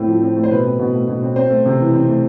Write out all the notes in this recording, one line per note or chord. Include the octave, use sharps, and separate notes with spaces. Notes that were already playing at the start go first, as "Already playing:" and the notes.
Already playing: A2 A3 C4
F3
C4
A3
C5
B2 B4
C4
B2
A3
B2
C4
C4 C5
A3
C3
E3
C4
A3